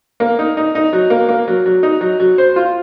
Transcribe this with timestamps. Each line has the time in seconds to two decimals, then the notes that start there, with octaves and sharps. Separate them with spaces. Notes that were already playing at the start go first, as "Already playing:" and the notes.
0.20 A#3
0.39 D#4
0.57 D#4
0.75 D#4
0.93 F#3
1.10 A#3
1.29 A#3
1.48 F#3
1.66 F#3
1.83 D#4
2.01 F#3
2.20 F#3
2.38 C5
2.56 F4